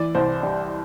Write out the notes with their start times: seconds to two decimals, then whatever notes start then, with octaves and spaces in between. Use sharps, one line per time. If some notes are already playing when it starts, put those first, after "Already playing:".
Already playing: E3 D5
0.15 C2 C5
0.43 G3